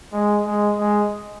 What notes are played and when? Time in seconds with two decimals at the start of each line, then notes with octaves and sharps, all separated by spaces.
0.13 G#3
0.46 G#3
0.79 G#3